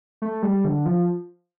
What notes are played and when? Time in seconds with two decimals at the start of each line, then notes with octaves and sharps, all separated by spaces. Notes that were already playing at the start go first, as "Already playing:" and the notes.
0.22 A3
0.43 G3
0.65 D3
0.85 F3